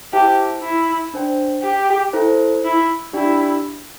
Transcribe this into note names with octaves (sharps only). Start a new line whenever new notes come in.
E4 G4 C5 E5 A5
E4
D4 C5 G5
G4
E4 A4 C5
E4
D4 E4 G4 D5 G5